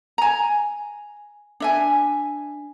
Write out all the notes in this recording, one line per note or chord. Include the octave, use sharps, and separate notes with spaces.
G#5 A#5
D4 E5 G#5